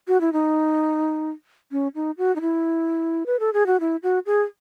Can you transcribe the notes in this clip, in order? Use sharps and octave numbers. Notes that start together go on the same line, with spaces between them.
F#4
E4
D#4
C#4
D#4
F#4
D#4
E4
B4
A4
G#4
F#4
E4
F#4
G#4